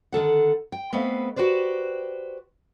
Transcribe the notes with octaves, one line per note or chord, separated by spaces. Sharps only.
D3 D#3 A4 F#5
G5
A3 B3 C4 B4 D#5 F5
F#4 G4 B4 C5 D5